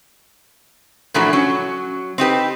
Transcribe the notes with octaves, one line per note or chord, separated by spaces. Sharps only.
A#2 E3 F3 A3 D4 F#4
F#3 C#4
C4 D#4 G4 B4